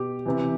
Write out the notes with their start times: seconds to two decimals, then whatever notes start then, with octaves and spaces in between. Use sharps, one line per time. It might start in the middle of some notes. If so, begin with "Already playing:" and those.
Already playing: B2 G4
0.26 C3 E3